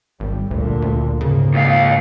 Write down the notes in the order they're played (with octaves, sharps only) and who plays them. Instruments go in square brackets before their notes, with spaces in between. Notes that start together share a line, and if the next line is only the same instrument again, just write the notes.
[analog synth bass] G#1 [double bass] G3
[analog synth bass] D2 [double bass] A#2 D3
[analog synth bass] D2
[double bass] G#2 A#3 [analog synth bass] C#3
[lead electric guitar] C#2 F5